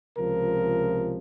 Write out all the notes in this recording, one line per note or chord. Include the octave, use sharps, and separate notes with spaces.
C#2 C3 F3 A#4